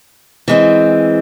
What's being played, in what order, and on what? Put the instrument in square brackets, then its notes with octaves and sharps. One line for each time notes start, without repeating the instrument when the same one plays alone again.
[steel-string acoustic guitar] E3 G#3 C4